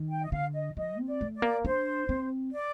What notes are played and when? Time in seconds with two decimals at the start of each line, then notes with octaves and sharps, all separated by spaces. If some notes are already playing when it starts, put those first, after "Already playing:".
Already playing: D#3
0.10 G5
0.24 D#5
0.32 D3 F5
0.54 D#5
0.77 F3 D#5
0.98 C4
1.05 D5
1.21 A3
1.35 D5
1.42 A#3
1.65 D4 C5
2.09 C4
2.54 D5